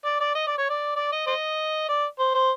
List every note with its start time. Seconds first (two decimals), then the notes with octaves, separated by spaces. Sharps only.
0.05 D5
0.21 D5
0.35 D#5
0.47 D5
0.58 C#5
0.70 D5
0.96 D5
1.12 D#5
1.27 C5 D#5
1.89 D5
2.19 C5
2.34 C5